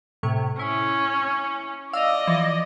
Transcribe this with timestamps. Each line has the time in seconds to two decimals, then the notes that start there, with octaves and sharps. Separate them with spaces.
0.23 A2 C3 C#6
0.59 C#4 E4
1.93 D5 D#5 F5 E6
2.27 E3 F3